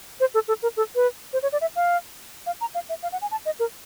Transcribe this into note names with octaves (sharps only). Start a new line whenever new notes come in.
C5
A4
A4
A#4
A4
B4
C5
C#5
D5
E5
F5
F5
A#5
F5
E5
F5
F#5
G#5
A5
D#5
A#4